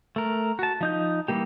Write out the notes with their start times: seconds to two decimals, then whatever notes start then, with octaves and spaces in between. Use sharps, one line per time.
0.16 A3 A#4
0.59 F#4 A5
0.81 F3 D#4 G6
1.28 E3 G3 A#3 G4